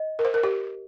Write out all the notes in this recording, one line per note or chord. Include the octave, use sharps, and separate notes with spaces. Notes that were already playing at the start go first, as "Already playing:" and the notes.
Already playing: D#5
A#4
C5
A#4
G4